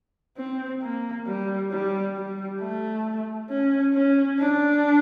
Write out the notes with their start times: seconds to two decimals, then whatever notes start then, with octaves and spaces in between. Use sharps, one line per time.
0.38 C4
0.82 A#3
1.27 G3
1.71 G3
2.16 G3
2.60 A3
3.49 C#4
3.94 C#4
4.38 D4